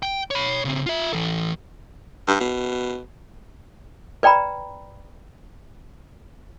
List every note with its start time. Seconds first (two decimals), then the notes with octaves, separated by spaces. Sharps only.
0.03 G5
0.31 C#5 B5
0.65 C#3 C4
0.86 F4 E5
1.13 E3 A4
2.28 G2
2.40 B2
4.23 B4 D5 G5 A#5 B5